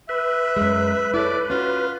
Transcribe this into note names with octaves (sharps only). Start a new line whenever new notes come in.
B4 E5
F#2 G#3
E4 A4 C#5 D5
C#4 F4 F#4